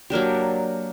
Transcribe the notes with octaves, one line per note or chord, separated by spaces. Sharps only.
F#3 A#3 D4 G4